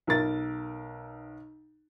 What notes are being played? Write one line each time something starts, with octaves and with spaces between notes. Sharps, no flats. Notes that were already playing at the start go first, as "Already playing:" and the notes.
B1 A#4 A6